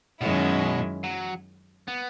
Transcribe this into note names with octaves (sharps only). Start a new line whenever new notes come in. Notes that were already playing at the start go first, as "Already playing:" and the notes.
F#2 B2 D#3 G#3 C#4 E4
F#3
B3